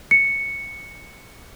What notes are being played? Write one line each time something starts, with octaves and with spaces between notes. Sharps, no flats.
C#7